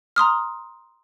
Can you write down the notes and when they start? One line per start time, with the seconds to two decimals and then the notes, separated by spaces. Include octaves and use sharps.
0.16 A#5 C6 D#6 F6